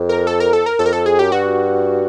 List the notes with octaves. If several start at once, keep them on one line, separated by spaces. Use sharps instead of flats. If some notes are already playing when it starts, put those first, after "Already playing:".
Already playing: F2
A#4
A4
A#4
A4
A#4
F2 A4
A#4
A4
G#4
F#2 G4
G2 F#4